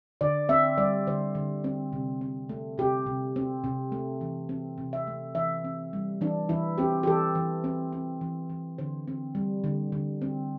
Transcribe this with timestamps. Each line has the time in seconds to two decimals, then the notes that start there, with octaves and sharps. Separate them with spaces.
0.21 D3 D5
0.49 C4 E5
0.78 G3 D5
1.07 D3 C5
1.35 D3
1.64 C4
1.93 C3
2.21 C4
2.49 A3
2.78 C3 G4
3.06 C3
3.36 C4
3.64 C3
3.92 A3
4.21 E3
4.49 C4
4.78 C3
4.93 E5
5.07 A3
5.35 E3 E5
5.65 C4
5.93 G3
6.21 E3 D4
6.49 E3 E4
6.78 C4 G4
7.03 G4
7.07 E3 A4
7.35 E3
7.64 C4
7.93 C4
8.21 E3
8.50 E3
8.78 D3 C5
9.07 C4
9.35 G3
9.64 D3
9.92 D3
10.22 C4